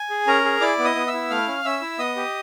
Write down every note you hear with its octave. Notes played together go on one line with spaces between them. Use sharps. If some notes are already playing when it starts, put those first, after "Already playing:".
Already playing: G#5
G#4
C#4 A#4 A#5
G#4
E4 D5 D6
B3
D#5 D#6
B3
E5 E6
E4
A3 F5 F6
C#4
C#4 E5 E6
E4
B3 D#5 D#6
G4